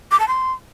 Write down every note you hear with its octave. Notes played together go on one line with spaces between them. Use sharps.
D6
A5
C6